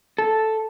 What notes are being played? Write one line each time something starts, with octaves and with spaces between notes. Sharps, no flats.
A4